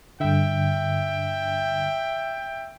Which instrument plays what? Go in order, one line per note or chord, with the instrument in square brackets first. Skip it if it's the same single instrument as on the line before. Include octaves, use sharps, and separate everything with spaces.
[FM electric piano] G2 D3 [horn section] E5 G5